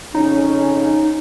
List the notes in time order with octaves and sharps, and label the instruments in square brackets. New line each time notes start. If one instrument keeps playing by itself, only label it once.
[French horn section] F2 C#3 C#4 [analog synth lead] D#4